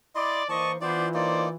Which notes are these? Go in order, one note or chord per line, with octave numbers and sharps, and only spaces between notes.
E4 D5 D#5 C6
E3 A#3 C5 D5 D#5 A5 C#6
E3 B3 D4 F4 C5 D5
A#3 D#4 C5 D5